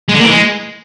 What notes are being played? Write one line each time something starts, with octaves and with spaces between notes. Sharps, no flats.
G#3
D3
A#2
E3
G#3